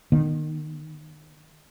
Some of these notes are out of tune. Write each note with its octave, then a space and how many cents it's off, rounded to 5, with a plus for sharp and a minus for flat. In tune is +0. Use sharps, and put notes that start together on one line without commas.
D#3 -25 A#3 +45